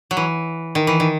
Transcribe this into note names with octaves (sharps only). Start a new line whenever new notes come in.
F#3
E3
D#3
E3
D#3